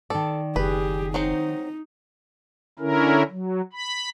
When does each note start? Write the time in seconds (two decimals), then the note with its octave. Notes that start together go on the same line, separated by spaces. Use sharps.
0.10 D#3 A4 D5
0.56 F#1 G4 G#4 B4
1.14 F#3 C4 D#4 C5
2.79 D3 C#4 E4 A#4
3.31 F#3
3.73 B5